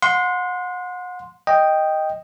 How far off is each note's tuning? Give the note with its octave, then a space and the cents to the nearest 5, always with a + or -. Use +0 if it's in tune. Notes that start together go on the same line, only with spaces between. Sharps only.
F#5 -35 C6 -5
D#5 +0 G5 +0